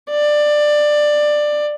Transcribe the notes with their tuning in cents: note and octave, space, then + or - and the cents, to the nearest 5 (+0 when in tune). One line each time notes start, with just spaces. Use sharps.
D5 +15